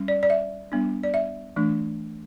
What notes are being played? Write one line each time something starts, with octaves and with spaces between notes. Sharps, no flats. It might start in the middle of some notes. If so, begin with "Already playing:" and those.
Already playing: G3 C#4
D5
D5
E5
G3 B3 D4
D5
E5
E3 A3 D4